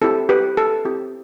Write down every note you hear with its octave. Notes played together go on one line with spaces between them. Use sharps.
C4 E4 G4 A4
G4 B4
A4
C4 E4 G4